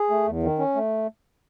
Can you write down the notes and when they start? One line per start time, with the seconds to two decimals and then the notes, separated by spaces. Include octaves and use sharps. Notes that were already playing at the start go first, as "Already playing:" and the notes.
Already playing: G#4
0.10 A3
0.27 E2
0.43 D#3
0.59 C#4
0.75 A3